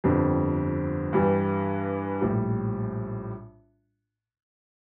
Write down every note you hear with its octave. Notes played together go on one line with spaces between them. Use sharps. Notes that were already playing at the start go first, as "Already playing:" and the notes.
G1 F2 D3 G3 C4
G2 E3 G3
A#1 A2 G3